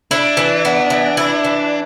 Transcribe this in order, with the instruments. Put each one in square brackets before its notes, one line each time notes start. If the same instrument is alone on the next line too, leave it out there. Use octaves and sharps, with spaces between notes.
[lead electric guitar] D4 [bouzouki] E4
[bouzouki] E3
B3
E3
E4
E3